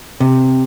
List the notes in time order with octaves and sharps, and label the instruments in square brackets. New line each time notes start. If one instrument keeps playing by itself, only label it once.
[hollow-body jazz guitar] C3